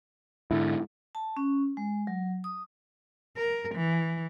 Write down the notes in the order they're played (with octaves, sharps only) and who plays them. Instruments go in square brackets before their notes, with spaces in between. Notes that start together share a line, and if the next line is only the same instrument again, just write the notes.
[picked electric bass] G#2 D3 [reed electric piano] E4
[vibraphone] A5
C#4
G#3
F#3
D#6
[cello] A#4
E3